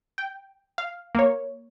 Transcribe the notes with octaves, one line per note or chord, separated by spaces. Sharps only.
G5
F5
A#3 C#5